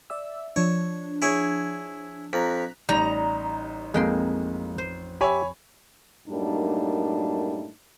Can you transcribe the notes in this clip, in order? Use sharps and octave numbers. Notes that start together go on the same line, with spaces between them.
D5 E5 E6
F3 D4 C#5
E4 G#4 C#5
F2 A#5 F#6 B6
A1 G3 D#4 A#5
F2 G#3 A#3 G5 C6
C5
G4 C#5 E5 G#5 B5
F#2 A2 G3 A#3 D4 D#4